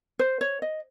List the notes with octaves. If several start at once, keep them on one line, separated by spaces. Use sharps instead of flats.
C5
C#5
D#5